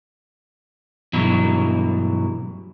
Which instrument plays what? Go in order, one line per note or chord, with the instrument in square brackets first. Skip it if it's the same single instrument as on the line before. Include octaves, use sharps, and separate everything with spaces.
[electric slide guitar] G2 B2 E3 F#3